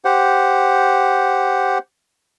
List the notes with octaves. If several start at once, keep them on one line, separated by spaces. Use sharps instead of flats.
G4 C5 F#5